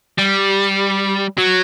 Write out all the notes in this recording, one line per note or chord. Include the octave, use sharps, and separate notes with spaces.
G3
F#3